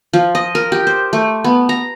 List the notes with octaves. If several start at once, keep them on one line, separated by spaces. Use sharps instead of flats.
F3
D#5
A#4
G4
C5
A3
B3
A#5